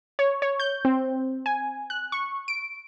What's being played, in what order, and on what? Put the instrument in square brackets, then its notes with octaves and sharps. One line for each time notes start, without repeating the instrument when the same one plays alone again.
[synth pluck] C#5
C#5
G6
C4
G#5
F#6
C#6
D7